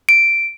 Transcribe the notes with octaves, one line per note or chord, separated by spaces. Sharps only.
D7